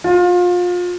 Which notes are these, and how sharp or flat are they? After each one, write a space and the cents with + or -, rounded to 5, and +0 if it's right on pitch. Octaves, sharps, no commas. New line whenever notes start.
F4 +30